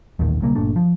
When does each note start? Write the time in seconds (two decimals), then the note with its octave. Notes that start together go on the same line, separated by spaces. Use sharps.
0.19 D#1 A1 D#2 D#3
0.42 B1 C#3 G3 A#3
0.55 G1 A#2 A3 D4
0.76 F3